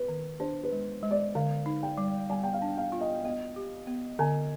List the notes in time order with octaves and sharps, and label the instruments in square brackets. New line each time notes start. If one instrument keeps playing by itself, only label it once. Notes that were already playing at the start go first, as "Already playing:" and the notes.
Already playing: [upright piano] B4
[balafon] D#3
[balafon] D4 [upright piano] C5
[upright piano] B4
[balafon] G#3
G#3
[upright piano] D5
[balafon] D3 [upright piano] F5
[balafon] D#4
[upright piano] G5
[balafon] G3
[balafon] G3 [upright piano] G#5
[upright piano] G5
F5
[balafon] D4
[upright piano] F5
[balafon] F4
[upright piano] D#5
[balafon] B3 [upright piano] D#5
[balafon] G4
B3
[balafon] D3 [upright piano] G#5